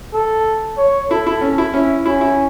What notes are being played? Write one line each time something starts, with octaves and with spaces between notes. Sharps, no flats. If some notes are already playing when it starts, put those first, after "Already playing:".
A4
C#5
E4 A4
E4
C#4
E4
C#4 E4
C#4 E4
E4